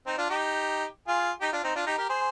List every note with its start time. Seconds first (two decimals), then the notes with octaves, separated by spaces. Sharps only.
0.06 C4 D#4
0.18 D4 F4
0.30 D#4 G4
1.08 F4 G#4
1.41 D#4 G4
1.52 D4 F4
1.63 C4 D#4
1.75 D4 F4
1.86 D#4 G4
1.98 G4 A#4
2.09 G#4 C5